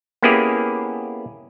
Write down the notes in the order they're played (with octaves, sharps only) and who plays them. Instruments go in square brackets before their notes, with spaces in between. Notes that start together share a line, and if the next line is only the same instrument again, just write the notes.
[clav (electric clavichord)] A#3 B3 C#4 E4 G4 G#4